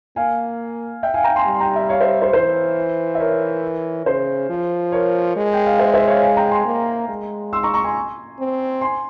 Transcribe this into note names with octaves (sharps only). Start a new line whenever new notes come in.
A#3 F5 G#5
E5 G5
F5 G#5
G5 A#5
G#5 C6
G3
C6
G5 A#5
E5 G5
C#5 F5
C5 E5
C5
E3 C5
E5
A#4 C#5
C#3 C5
F3
A#4 C#5
G#3
G5
F5
C5 E5
C5 E5
C#5 F5
F5 G#5
G5 A#5
G#5 C6
A#3
G#3
C6 E6
A#5 C#6
A#5 C#6
G#5 C6
C4
G#5 C6